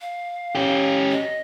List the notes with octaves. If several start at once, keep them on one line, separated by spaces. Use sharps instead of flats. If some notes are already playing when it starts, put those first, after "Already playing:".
F5
C#4 G4
D#5